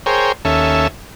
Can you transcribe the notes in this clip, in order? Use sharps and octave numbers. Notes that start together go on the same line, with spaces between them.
G#4 A#4 C5 C#5 G5
D#2 C#4 A4 E5